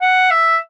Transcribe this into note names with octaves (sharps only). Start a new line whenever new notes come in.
F#5
E5